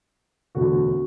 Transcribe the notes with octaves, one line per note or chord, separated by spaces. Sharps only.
E1 D2 D3 F#4